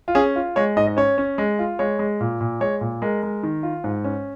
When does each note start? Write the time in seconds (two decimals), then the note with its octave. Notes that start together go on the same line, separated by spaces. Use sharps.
0.08 F4
0.15 C#4 G#4
0.36 F4
0.56 G#3 C#5
0.77 G#2 D#5
0.87 D#5
0.97 C#4 C#5
1.18 C#4
1.38 G#3
1.59 F4
1.79 G#3 C#5
1.99 G#3
2.20 A#2
2.41 A#2
2.60 G#3 C#5
2.81 A#2
3.02 G#3 A#4
3.23 G#3
3.43 D#3
3.63 F4
3.84 G#2
4.04 C#4